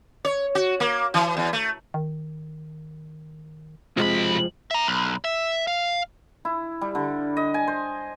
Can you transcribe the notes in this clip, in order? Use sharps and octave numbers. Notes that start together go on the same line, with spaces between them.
C#5
F#4
A#3
E3
E2
A3
D#3
B1 F2 C3 F3 G#3 B5
E5 A#5
B1
E5
F5
E4
G3
D3
D#5
G#5
C5